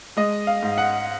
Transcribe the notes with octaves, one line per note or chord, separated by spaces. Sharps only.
G#3 D#5
F5
G#2
F#5